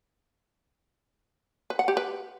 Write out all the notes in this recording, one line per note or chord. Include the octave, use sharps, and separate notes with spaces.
B4
F#5
G4
B4